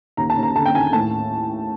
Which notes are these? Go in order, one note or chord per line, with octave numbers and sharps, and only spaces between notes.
D#2 A#5
A5
D#2
A#5
D3 A5
G5
D#2 G#5
A2 A5